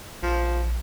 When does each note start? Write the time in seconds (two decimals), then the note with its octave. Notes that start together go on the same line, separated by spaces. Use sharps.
0.22 A#1 F3